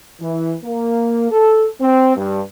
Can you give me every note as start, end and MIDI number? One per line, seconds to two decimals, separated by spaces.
0.20 0.54 52
0.64 1.31 58
1.31 1.66 69
1.81 2.16 60
2.17 2.41 43